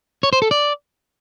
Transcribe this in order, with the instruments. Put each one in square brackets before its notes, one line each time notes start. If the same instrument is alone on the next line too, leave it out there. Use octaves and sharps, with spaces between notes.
[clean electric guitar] C#5
C5
A4
D5